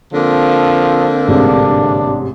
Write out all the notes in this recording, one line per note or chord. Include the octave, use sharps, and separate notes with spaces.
D3 F3 A#3 C4
A1 G#2 C3 D4